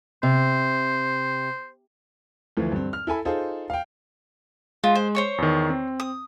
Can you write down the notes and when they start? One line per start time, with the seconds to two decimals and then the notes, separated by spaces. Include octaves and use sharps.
0.23 C3 C5
2.57 D2 E3 F3
2.72 G2 C4
2.93 F6
3.07 E4 A4 G#5 B5
3.25 D#4 F4 G#4 A4 C5
3.70 F5 G5
4.84 G#3 F4
4.95 C5
5.15 C5 C#5 C#6
5.38 E2 D#3
5.70 C4
6.00 D#6